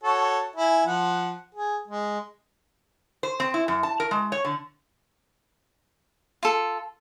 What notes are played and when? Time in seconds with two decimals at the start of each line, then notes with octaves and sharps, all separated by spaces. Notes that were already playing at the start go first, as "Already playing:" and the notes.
0.03 F#4 A4 C#5
0.56 E4 G#5
0.86 F3 F#5
1.55 G#4
1.88 G#3
3.23 C5
3.40 C4
3.54 E4
3.68 F#2
3.83 A5
4.00 A#4
4.11 G#3
4.32 C#5
4.45 D3
6.43 F4 A4